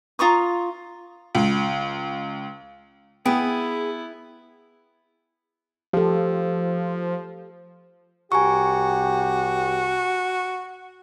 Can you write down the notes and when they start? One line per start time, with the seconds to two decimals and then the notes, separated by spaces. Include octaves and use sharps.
0.19 F4 A#5 C#6 D#6
1.35 C#2
3.26 B3 E4 G#4 G5
5.93 F3 G4 A4
8.32 C2 F#4 G4 G#5 A#5 C#6